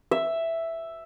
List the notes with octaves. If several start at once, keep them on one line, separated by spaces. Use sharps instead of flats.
E5